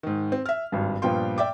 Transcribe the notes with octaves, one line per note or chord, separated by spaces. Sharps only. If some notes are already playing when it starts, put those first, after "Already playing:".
G#2 D#3
C4
E5 F6
G#1 G2
G2 A#2 F3 B3 G5 C6
D5 E5 G5 D6